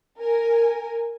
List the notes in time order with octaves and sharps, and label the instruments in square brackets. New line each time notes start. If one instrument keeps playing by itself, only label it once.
[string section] A#4 G#5